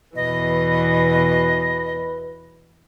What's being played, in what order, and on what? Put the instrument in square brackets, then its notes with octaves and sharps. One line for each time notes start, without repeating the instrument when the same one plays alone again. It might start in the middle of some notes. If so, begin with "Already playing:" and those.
[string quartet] E2 B2 E3 [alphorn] B4 [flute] D#5